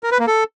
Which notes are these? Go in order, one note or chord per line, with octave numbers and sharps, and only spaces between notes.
A#4
B4
A#3
A4